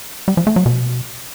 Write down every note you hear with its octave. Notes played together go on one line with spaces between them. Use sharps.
G3
F3
A3
F#3
B2